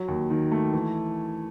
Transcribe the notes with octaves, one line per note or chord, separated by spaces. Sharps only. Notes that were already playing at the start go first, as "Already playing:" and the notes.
Already playing: F#3
D#2
D#3
A3
E3